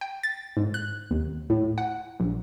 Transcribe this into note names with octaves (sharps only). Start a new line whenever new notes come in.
G5
A6
G#2
F#6
D#2
A2
F#5
A#1